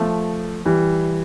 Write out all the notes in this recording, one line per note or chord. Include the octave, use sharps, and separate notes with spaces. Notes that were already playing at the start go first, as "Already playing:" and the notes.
Already playing: F3 A3
E3 G3